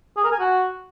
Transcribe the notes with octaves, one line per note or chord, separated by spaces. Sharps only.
G#4
A#4
G#5
F#4